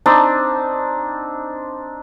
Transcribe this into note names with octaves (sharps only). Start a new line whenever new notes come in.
C4 D4 D#4